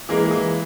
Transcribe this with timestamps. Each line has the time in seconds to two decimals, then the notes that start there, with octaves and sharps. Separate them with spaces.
0.09 E3 G#3 A#3
0.31 E3